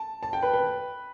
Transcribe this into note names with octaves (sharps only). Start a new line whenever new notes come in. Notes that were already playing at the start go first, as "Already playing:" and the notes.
Already playing: A5
A5
G5
B4
B4